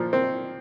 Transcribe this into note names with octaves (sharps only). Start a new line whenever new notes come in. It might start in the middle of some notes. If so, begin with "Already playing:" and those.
Already playing: A#2 F3
C4